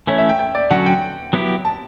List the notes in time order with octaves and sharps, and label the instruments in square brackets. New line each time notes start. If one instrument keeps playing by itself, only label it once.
[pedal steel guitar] E3 A3 C#4 E4 [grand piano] C#5
[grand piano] E5
G5
G5
D5
[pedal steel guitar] D3 F#3 C#4 F#4 [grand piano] F#5
[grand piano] G5
[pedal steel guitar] F#3 B3 E4 G4
[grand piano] A5